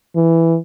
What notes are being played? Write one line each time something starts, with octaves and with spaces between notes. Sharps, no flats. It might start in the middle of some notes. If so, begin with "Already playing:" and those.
E3